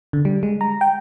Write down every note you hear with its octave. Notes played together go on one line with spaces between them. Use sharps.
D3
G3
G#3
A#5
G5